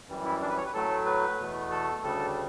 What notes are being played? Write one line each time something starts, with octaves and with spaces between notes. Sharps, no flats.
F#2 E3 G3
E4
D4
B4
C#5
B4
A2 F#3 A3 A4
B4
E2 B2 A3
A4
D2 C#3 G3 A4